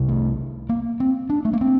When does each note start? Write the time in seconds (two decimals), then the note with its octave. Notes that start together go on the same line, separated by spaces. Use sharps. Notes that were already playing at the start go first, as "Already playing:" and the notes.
Already playing: C2 C3
0.08 A3
0.69 A#3
1.00 C4
1.30 D4
1.45 A3
1.53 A#3
1.61 C4